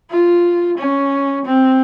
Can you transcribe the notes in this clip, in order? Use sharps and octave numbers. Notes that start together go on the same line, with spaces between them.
F4
C#4
C4